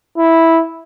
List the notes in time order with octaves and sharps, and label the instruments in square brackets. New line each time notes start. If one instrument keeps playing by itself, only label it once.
[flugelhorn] E4